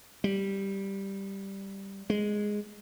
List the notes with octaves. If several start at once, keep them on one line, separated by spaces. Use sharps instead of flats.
G3
G#3